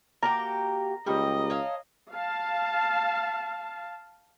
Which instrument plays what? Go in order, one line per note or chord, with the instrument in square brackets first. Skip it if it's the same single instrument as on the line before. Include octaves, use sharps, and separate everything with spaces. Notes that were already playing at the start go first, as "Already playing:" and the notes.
[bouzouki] A#3 F#4 G4 [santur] A#5
[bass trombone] C#2 [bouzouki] G3 A#3 [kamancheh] D#5
[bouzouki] C#5 F5 A5
[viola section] F5 A5